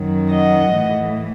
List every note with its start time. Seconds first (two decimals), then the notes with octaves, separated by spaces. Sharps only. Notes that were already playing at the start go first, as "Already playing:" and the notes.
Already playing: F#2 D#3 F#3
0.30 D#5 F#5
0.72 A2 E3 A3